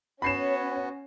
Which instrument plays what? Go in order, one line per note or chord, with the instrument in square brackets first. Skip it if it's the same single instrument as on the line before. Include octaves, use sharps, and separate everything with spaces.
[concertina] B3 F#4 [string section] C#4 [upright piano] B5 C7 E7